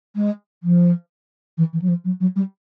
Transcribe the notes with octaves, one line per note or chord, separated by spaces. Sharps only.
G#3
F3
E3
E3
F#3
F3
F#3
F#3
G3